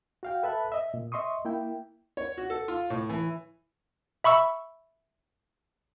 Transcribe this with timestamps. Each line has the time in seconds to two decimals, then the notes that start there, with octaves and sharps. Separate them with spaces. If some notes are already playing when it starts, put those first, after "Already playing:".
0.23 F#4 F5 G5
0.43 A4 B4 E5 A5 B5 F#6
0.72 D#5 E5
0.94 A#2
1.12 D#5 E5 C6 C#6 D#6
1.45 A#3 E4 G5
2.17 C#5
2.37 F#4
2.50 A4
2.68 F4
2.90 A2
3.09 E3
4.24 E5 B5 C#6 E6